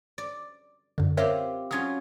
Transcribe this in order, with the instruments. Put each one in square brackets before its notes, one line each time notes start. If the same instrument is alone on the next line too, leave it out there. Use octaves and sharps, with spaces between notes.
[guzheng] D5
[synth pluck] F#2 D3
[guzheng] C4 F4 G4 [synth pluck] A#4 C#5 E5
[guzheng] F#3 C#4 F4 [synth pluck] D#6 G#6